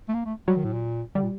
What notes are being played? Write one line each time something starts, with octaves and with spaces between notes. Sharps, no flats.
A3
A#3
A3
F#3 G3
D#3
A2
A#2
D3 G3
A#2